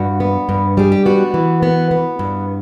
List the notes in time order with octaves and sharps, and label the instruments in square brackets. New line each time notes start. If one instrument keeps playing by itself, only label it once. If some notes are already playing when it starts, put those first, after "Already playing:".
Already playing: [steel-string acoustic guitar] G2 F#4
B3
G2
G3 G#4
G4
B3 F#4
E3
B3
B3
G2